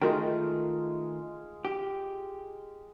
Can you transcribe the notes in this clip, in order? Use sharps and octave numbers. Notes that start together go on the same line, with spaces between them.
D#3 G#3 A3 D#4 F4 F#4 A#4 G5
G4